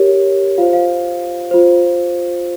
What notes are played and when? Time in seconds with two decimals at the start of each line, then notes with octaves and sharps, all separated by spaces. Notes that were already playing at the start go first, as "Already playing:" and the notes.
Already playing: G4 A#4 C#5
0.58 F4 C5 F5
0.73 F5
1.51 F4 C5